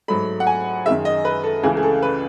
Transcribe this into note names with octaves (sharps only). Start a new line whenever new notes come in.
G#2 F#3 A3 B5
F#5
G#5
F#2 D#3 G#3 E5
D#5
B4
A4
C#2 C#3 E3 A3 G#4
G#4
A4
B4